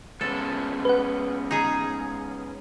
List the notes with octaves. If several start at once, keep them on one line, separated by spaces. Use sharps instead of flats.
G#3 B3 C#4 A4
B4 F#5
D#4 G#4